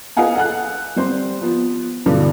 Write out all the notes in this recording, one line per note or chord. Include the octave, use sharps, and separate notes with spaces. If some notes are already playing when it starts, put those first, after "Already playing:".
G#4 B4 D#5 F5 F#5 G#5
A4 F#5 F#6
G3 C4 C5 C6
F3 B3
G2 B2 D3 E3 D4